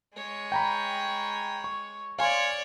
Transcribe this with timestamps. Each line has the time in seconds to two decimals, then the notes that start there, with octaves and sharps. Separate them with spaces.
0.14 G#3 C#5
0.52 G5 A#5 B5
1.64 C#6
2.19 C#5 D5 F5 G#5 C6